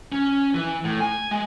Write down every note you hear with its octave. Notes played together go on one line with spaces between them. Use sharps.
C#4
E3
A2
G#5
G#3